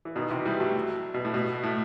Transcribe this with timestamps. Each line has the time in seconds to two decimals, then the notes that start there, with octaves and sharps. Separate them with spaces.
0.05 E3
0.16 B2 D#3
0.31 C3 E3
0.45 E3 G3
0.60 F#3 A3
1.14 B2
1.25 A2
1.34 B2
1.63 A2